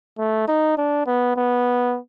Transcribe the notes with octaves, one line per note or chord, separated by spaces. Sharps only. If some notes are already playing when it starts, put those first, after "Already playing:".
A3
D#4
D4
B3
B3